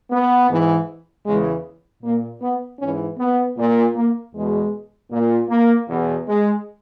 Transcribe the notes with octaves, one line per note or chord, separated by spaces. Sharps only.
B3
G#2 E3
E2 C#3 E3 G#3
A#2 A#3
B3
G#2 E3 C#4
B3
A#2
A#3
E2 B2 G#3
A#2
A#3
E2 B2
G#3